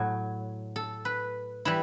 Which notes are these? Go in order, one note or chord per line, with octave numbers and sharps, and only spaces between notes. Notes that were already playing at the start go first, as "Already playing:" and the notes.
Already playing: A2 F#3
A4
B4
E3 G3 E4